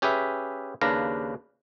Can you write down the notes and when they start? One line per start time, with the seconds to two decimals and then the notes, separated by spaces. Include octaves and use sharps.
0.02 C#4 G4 G#4 B4 E5
0.81 D#2 C#3 D4 B4 F5 A#5